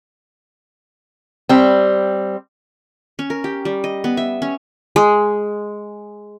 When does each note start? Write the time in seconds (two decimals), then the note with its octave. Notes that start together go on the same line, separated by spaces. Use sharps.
1.49 G3 C4
3.19 C#4
3.30 A#4
3.44 G4
3.65 G3
3.84 D#5
4.04 B3
4.17 E5
4.42 C#4
4.96 G#3